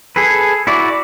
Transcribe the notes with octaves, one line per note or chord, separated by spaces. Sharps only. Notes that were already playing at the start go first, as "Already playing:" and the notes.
G#4 A4 B4
E4 F#4 D5